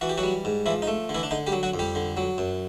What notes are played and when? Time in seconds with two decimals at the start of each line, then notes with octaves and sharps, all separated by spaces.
0.01 E3 F#4
0.09 G4
0.18 F#3 F#4
0.23 G3
0.45 G#2
0.66 E3 F3 E4
0.82 D#4
0.87 A3
1.09 D3
1.15 E3 E4
1.23 D4
1.31 D3 D#4
1.47 G3 G4
1.52 F#3
1.63 F#3 F#4
1.74 F2
1.79 G3 G4
1.95 D3
2.17 F#3
2.38 F#2